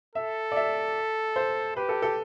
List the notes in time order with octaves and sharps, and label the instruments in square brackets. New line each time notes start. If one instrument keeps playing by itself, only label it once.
[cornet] A4 [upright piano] E5
[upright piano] D5
E5
C5
[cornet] G4 [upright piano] B4
[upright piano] A4
A4